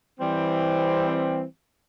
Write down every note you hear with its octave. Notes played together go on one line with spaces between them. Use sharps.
E3 G3 C4